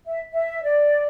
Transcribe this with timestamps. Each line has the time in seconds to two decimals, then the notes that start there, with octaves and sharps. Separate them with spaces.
0.06 E5
0.32 E5
0.63 D5